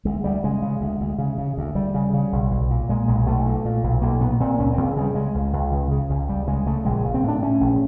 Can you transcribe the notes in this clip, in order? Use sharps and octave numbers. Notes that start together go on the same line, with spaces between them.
D2 G#3
D2 G3
C#3 G#3
C#3
D2
D2
C#3
C#3
D2
D2 G3
C#3
C#3
B1
B1
A#2
A#2 G#3
B1 G#3
B1 A3
A#2
A#2
B1
B1 A#3
A#2 B3
A#2 C4
C#2 C#4
C#2 C4
C#3 G3
C#3 G#3
C#2
C#2
C#3
C#3
C#2
C#2 G3
C#3 G#3
C#3 A3
A#1 G#3
A#1
C4
A2 D4
A2 C#4
A#1